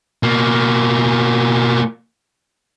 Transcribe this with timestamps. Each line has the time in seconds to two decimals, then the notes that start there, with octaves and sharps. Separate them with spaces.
0.23 B2 A#3